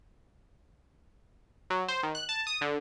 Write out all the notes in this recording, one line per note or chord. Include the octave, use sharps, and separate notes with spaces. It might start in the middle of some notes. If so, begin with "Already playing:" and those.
F#3
C5
D#3
F#6
A5
D#6
D3